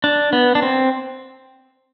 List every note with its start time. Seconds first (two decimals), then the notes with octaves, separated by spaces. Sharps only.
0.04 D4
0.33 B3
0.55 D4
0.62 C4